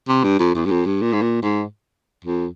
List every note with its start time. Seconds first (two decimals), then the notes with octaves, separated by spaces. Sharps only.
0.08 C3
0.24 G2
0.39 F2
0.55 E2
0.65 G2
0.71 F2
0.86 G2
1.02 A#2
1.13 G#2
1.22 A#2
1.42 G#2
2.25 F2